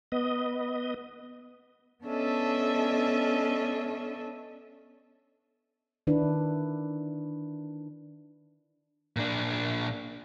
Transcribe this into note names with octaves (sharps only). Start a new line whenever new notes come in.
B3 D#5
B3 C#4 D4 A4 D#5 E5
D#3 D4 E4 B4
A#2 D4